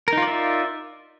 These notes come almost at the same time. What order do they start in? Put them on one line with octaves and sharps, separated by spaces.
A#4 D#4 F4 D5 E5